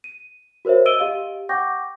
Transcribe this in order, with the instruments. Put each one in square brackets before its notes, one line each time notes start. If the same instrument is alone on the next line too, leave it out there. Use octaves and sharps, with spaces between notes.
[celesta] D#7
F#4 A#4 C5 C#5 E5
D#5 E6 D7 D#7 G7
G4 D#5 F5
F#5 G5 C#6 D6 G6 A#6